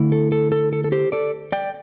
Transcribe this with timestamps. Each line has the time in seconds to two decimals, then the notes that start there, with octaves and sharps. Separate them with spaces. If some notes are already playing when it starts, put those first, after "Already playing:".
Already playing: D3 A3 E4
0.12 A4
0.32 A4
0.52 A4
0.73 A4
0.84 A4
0.92 G4 C5
1.12 A4 D5
1.52 D5 G5